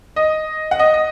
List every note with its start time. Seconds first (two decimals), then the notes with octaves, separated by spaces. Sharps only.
0.16 D#5
0.71 F#5
0.79 D#5
0.94 D#5